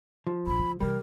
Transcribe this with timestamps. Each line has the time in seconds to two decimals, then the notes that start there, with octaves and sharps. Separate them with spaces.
0.27 F3
0.47 A#1 D4 B5
0.59 D2 C#3
0.80 C3 E3 G3 A#4